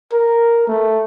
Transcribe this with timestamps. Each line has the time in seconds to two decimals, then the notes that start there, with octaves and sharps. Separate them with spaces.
0.12 A#4
0.68 A3